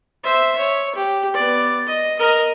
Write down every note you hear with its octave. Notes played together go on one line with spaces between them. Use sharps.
C5 E5
C#5
G4
B3 D5
D#5
A#4 D#5